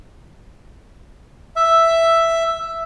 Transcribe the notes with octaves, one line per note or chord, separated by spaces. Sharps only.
E5